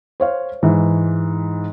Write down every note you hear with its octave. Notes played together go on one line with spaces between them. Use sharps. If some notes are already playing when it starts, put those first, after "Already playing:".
C5 C#5 F5
G#2 E3